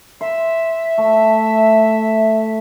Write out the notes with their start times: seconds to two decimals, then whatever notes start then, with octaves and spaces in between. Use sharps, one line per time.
0.21 E5 C6
0.98 A3